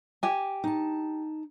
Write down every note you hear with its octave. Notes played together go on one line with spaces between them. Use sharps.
G4 G#5
D#4 A5